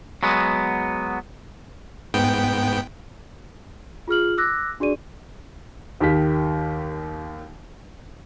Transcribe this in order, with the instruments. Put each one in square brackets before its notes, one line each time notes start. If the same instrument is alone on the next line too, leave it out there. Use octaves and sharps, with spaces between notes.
[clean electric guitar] F#3 G#3 B3
[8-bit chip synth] G#2 B3 G5
[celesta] F4 G#4 F6 F#7
D6 E6 F#6 A#6
D4 F#4 G#4 D5 D#7
[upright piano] D#2 D#3 G4 B6